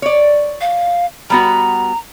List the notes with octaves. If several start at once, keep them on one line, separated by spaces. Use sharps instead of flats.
C#5 D5
F5
G3 B3 F#4 A#5